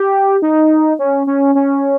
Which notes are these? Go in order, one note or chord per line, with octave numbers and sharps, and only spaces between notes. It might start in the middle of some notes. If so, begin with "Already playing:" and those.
Already playing: G4
D#4
C#4
C#4
C#4